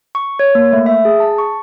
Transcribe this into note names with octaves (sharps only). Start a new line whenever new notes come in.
C#6
C#5
A#3
A3
E5
G#4
A5
C#6